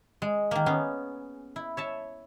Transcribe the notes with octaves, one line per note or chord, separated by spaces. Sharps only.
G#3
D#3 A#3
B3 C#4 G#4
E4
C#5 E5 A5